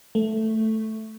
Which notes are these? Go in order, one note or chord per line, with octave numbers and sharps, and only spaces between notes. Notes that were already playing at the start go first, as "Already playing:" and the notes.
A3